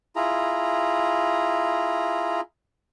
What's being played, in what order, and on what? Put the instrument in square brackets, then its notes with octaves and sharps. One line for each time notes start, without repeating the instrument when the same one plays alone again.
[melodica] E4 F4 G#4 A#5